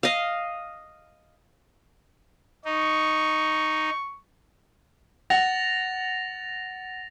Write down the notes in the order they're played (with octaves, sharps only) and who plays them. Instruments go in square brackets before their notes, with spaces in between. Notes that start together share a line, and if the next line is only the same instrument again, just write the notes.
[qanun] D#5 F5
[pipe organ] D#4 [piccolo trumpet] C#6
[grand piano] F#5 [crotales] A6 A#6 F7